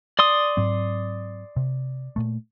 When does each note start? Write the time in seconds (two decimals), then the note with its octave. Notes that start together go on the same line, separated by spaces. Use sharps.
0.19 D5 C6 D#6
0.57 G#2 F#3 C4
1.56 C3
2.16 A#2 A3